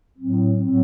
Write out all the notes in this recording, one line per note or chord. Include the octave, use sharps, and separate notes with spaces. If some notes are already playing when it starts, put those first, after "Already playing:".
A2 F#3 C4
A2 F#3 C4